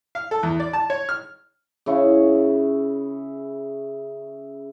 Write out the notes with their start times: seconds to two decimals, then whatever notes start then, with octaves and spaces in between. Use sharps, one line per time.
0.15 F5
0.31 A4
0.43 E2
0.60 D5
0.73 A5
0.90 C#5
1.09 F6
1.86 C#3 E4 C#6